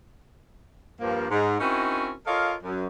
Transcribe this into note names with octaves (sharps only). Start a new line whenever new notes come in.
G2 F3 A#3
G#2
C4 C#4 D#4 E4 F#4 A#4
F4 A4 A#4 C#5 D#5 F5
F#2